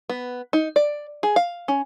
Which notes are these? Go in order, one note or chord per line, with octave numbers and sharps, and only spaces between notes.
B3
D#4
D5
G#4
F5
C#4